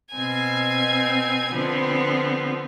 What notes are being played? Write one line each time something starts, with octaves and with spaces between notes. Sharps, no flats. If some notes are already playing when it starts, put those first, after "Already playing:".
B2 C4 G#5 G#6
D3 F3 B3 C4